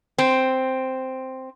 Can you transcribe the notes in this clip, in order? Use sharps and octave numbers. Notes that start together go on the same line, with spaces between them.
C4